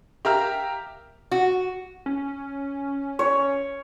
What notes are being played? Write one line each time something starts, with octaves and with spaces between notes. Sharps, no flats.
G4 A#4 E5 F5 A#5 F6
F#4
C#4
C#5